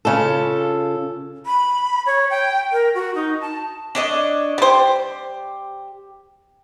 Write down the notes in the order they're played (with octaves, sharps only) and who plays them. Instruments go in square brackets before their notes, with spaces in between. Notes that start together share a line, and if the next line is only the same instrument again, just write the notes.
[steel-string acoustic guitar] C#3 F4 A4
[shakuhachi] B5
C#5
G5
A#4
F#4
D#4
A5
[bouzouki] D4 C#5 D#5
[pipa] G3 C5 [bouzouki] G4